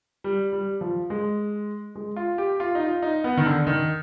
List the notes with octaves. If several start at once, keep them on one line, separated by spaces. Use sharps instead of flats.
G3
G3
F3
G#3
G#3
F4
G4
F4
D#4
F4
D#4
B3
D#3
D3
D#3